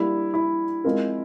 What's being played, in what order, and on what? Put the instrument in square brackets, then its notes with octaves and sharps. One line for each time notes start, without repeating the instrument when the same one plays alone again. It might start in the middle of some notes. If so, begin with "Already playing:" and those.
Already playing: [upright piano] G3 A#3 D4 [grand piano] E4
[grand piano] E4
[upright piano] G#3 C4 F4 A#4